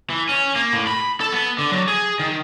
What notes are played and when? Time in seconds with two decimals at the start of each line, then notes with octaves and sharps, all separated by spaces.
0.10 E3
0.29 C#4
0.56 A#3
0.72 A2
0.87 B5
1.21 A4
1.32 B3
1.58 D3
1.72 F#3
1.88 G#4
2.20 D#3